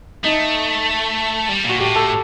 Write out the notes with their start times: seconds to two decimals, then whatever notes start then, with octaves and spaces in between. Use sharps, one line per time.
0.24 A3 D#4
1.49 G3
1.64 A#2 F#4
1.79 A2 G4
1.96 A4